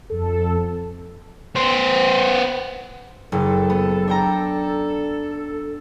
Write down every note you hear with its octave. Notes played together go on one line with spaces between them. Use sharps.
F2 A4
B3 C5
F#1 A4
B3
D4 G5 A#5